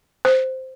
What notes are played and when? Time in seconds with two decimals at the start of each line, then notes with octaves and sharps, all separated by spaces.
0.25 C5